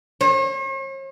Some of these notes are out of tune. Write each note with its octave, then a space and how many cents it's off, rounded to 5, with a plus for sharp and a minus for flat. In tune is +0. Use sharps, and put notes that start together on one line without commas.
C#5 -45